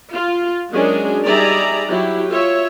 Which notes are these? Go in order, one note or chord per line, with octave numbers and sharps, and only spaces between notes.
F4
F#3 G#3 C#4 D4 G#4 A#4
G3 D#4 G#4 D5 E5 A#5
F#3 E4 G4
F4 C#5 E5